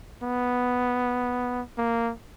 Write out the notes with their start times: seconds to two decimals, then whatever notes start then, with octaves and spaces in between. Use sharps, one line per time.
0.23 B3
1.78 A#3